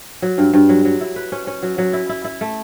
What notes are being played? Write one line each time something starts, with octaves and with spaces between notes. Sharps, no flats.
F#3
G2
G2
F#3
F#3
E4
B4
C#4
C#4
F#3
F#3
E4
E4
E4
A3